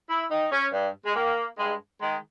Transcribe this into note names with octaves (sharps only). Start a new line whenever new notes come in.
E4
D#3 D#4
C#4
G2
G#3
D#3 A#3
G2 G#3
D#3 G#3